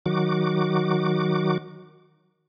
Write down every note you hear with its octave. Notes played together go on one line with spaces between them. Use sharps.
D#3 F#3 F#4 D6